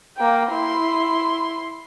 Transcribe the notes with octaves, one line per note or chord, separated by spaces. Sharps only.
A#3 G5
E4 C6